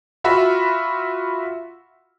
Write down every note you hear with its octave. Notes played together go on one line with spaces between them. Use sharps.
F4 F#4 E5 B5